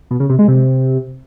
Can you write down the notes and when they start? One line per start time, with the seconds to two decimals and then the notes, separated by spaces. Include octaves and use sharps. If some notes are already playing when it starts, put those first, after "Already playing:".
0.11 B2
0.20 C#3
0.29 C3
0.39 G#3
0.48 C3